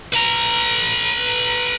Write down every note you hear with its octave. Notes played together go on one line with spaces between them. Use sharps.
B4 A#5